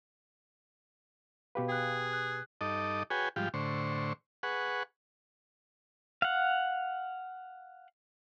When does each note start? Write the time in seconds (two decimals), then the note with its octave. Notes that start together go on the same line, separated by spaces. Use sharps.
1.55 B2 G4 B4 F5
1.69 G#4 G5 F#6
2.13 F#6
2.61 G2 D#4 A4 D#5 D6
3.10 F#4 G#4 B4 C#5 G5 G#5
3.36 G#2 F3 G3 F4 G4
3.54 A2 D3 C5 C#6
4.43 G#4 B4 F#5 C#6
6.22 F5 F#5